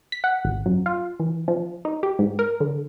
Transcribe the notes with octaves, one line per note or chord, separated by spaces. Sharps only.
B6
F#5
G#1
F#2
F4
E3
F3
D#4
G4
G#2
A#4
D3